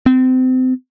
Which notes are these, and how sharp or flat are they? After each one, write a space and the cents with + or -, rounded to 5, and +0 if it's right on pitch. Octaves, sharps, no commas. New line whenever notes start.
C4 -30